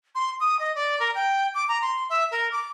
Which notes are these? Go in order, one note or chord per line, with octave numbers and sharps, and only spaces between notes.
C6
D#6
D#5
D5
A#4
G5
D6
A#5
C6
E5
A#4
D6